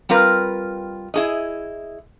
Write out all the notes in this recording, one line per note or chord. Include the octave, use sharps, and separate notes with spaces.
G3 C4 F4 A#4 B4
E4 G#4 D#5